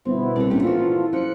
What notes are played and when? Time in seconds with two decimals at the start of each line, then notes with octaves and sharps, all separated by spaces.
0.05 G1 B2 B3 C4 E4
0.36 C2 D3 D5
0.50 A2 A3 A#3 C#4 D4 G4
0.62 A#2 E3 F3 F4 F#4 A4
1.13 F#2 F3 F#6 C#7